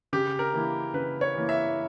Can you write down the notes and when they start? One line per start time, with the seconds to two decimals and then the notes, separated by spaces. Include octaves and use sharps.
0.13 C#3 G4
0.39 A#4
0.54 E3 A#3 E4
0.94 C#3 B4
1.21 C#5
1.35 E3 A#3 E4
1.49 E5